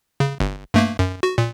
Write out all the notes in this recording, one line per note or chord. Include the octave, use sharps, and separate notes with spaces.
C#3
G1
G2 A3 A#3
F#2
F#4
A#2